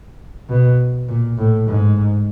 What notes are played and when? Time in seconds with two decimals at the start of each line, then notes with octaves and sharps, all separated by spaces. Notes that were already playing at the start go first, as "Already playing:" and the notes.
0.49 B2
1.08 A#2
1.37 A2
1.67 G#2